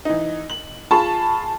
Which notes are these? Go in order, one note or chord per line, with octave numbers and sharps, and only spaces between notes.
E3 D#4
F#7
F4 G#4 A5 B5 C#6